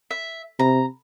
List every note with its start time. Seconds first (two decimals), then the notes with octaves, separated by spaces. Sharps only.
0.11 E5
0.59 C3 A#5